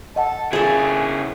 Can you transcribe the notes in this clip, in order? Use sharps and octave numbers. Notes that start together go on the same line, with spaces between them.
A4 D#5 F#5 A5
C#3 E4 G#4 A4 G#5